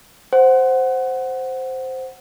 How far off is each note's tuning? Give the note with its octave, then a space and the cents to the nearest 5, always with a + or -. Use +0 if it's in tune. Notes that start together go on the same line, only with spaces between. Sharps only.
C5 +0 F#5 +0